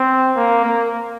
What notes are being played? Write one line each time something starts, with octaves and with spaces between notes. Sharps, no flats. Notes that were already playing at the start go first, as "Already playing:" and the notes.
Already playing: C4
A#3
A#3